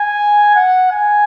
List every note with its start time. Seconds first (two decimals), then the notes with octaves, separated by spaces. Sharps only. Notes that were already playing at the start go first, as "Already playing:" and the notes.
Already playing: G#5
0.55 F#5
0.92 G#5